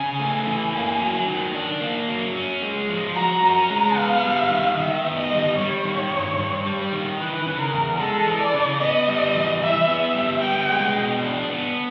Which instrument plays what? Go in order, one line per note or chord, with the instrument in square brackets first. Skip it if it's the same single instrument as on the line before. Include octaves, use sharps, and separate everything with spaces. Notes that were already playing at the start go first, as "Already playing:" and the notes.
Already playing: [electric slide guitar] C#3 [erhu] G#5
[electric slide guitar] A3
[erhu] G#5
[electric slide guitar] E3
A#3
F#3
D#3
D4
A#3
F#3
C#4
G#3
F3
[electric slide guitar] F#4 [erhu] A#5
[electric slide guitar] C#4
[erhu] A#5
[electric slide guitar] G#3
[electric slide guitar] B3 [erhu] F5
[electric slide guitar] G3
D#3
[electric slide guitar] D#3 [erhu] E5
[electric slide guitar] B3
[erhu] D#5
[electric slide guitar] G3
[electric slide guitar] G3 [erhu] C#5
[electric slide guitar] D#3
G2
G2
G3
D#3
[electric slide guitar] E3 [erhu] B4
[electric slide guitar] C#3
[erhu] A#4
[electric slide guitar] E2
[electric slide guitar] G#3 [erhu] A4
[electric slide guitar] E3
[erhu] D5
[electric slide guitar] C#3
[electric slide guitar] B3 [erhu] D#5
[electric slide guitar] G3
E3
[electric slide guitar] E3 [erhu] E5
[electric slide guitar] B3
[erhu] E5
[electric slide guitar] G3
[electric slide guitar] B3 [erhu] G5
[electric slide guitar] G#3
B2
D4
B3